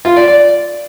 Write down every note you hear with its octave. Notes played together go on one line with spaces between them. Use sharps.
F4
D5
D5